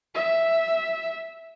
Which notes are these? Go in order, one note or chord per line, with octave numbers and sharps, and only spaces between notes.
E5